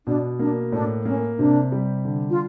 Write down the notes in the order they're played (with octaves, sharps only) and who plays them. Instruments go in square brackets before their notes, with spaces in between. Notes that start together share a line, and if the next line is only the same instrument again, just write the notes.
[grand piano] B2 [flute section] D4
[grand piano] A#3 [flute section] D4
[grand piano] A2 [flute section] D4
[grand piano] A#3 [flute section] C#4
[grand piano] C3 [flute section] D4
[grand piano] G3
D3
[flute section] F4